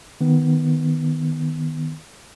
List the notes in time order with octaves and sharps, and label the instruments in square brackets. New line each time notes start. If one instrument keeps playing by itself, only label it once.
[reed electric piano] D#3 B3